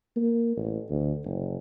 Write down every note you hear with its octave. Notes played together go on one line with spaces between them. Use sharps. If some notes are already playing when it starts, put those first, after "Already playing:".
A#3
A1
D2
F#1